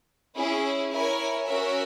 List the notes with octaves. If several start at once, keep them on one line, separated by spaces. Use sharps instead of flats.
C#4 E4 G#4
E4 A#4 C#5 G#5
C#4 F#4 A#4 E5